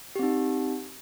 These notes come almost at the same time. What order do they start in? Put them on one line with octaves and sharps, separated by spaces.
G4 C4 D#4